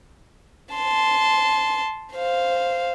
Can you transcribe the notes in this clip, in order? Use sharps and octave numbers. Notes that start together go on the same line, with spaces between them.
A5 C6
C5 F5